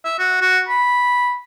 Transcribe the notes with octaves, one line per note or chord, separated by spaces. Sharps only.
E5
F#4
F#4
B5